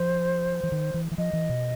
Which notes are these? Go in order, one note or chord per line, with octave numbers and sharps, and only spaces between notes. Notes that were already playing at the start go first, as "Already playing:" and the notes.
Already playing: F3 C5
E3
D#3
E3
E3
F3 D#5
E3
B2